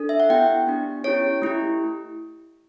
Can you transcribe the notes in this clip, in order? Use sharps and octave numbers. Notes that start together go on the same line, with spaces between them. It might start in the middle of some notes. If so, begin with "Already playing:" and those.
Already playing: D4 A4
E5
F#5
B3 E4 G4 G5
B3 D4 G4
C#4 E4 G4 C#5
A3 E4 G4